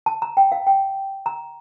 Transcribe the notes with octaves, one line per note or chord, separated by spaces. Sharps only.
A5
A#5
G5
F5
G5
A#5